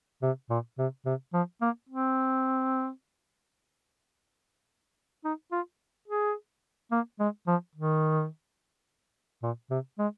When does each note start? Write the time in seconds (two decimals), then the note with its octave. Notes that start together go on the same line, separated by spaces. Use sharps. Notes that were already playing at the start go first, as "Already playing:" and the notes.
0.22 C3
0.50 A#2
0.78 C3
1.06 C3
1.34 F3
1.61 A#3
1.89 C4
5.24 D#4
5.52 F4
6.08 G#4
6.92 A#3
7.20 G#3
7.47 F3
7.75 D#3
9.43 A#2
9.70 C3
9.99 G#3